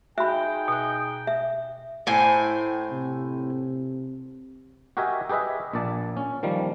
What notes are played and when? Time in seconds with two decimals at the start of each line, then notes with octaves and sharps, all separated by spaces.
0.18 D#4 F#4 G#4 E5 G5 B5
0.68 B2 F#6
1.27 E5
2.07 A2 C5 G#5
2.91 C3
4.97 F#4 G4 A#4 D#5 E5 G#5
5.29 G4 G#4 B4 D#5 E5
5.73 A#1 A#2 D5 A5
6.17 C#4
6.43 D#3 F3 G3 A#3